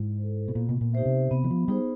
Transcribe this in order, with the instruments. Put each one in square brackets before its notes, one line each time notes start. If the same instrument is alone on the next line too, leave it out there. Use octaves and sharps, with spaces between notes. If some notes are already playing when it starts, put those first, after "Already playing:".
Already playing: [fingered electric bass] G#2 [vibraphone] E4
[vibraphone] A4 C5
[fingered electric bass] B2
[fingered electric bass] A#2 [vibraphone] B3
[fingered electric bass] B2
A#2
[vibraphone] D#4 G4 C5 E5
[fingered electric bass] C3
[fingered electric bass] C3 [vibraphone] B3
[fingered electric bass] E3
F3
[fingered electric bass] G3 [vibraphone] D#4 G#4 C5